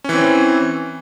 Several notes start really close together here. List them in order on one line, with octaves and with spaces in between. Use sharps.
C#4 E3 C4